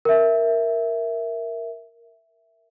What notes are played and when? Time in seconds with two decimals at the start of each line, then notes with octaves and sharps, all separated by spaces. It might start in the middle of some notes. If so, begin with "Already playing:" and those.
0.05 A#4 E5